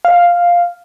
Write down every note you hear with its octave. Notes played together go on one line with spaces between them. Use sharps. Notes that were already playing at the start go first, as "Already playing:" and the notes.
F5